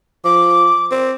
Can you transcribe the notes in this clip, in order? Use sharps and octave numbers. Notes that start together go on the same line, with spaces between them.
F3 D6
C4